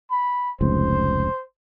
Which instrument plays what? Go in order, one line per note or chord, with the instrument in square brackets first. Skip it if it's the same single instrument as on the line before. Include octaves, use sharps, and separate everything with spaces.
[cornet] B5
[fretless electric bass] F1 C#2 [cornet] C5